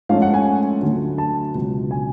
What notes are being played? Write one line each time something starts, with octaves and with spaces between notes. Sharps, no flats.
G#2 F3 A3 C#4 F5
F#5
G#5
D2 D3 F#3 A3
A5
C#2 B2 F#3
G#5